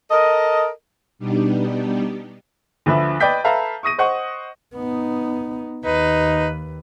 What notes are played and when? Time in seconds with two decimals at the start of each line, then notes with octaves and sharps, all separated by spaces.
0.11 A4 A#4 D#5
1.19 B2 G3 B3 D4 D#4 G4
2.86 D2 D3 F3 B4 E5
3.20 B4 D5 D#5 G5 G6 B6
3.44 A4 B4 E5 F5 A5 A#5
3.83 C#6 D#6 A#6 D#7
3.98 C5 D#5 F#5 C#6
4.75 B3 D#4
5.86 D#2 D#4 B4